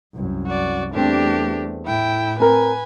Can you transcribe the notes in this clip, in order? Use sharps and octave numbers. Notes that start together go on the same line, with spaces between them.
C2 F#2
F#4 D5
E2 G3 A3 C4 D4 G4
A2 E4 G5
C4 A#4 B4 G#5